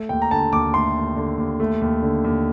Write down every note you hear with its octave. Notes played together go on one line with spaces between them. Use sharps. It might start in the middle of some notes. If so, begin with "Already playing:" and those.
Already playing: A3
D#2 G5
A#5
D3 A5
D#2 D6
A3 C6
D#2
D3
D#2
A3
D#2
D3
D#2